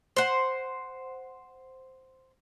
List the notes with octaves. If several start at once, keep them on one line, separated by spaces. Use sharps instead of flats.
C5 F#5